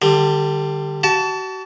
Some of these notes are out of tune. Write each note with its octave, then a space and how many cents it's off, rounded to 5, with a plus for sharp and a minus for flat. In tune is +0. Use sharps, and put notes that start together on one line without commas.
D3 +25 G3 +0
F#4 +40 A5 +0